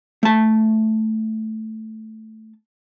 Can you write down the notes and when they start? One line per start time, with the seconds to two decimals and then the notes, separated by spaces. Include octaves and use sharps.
0.23 A3 A5